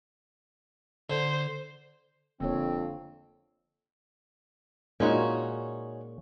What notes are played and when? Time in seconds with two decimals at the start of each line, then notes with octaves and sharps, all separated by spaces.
1.10 D3 C5
2.40 D#1 F2 D3 A#3 C4 C#5
5.00 A#2 G#3 C#4 D#4 F4 F#4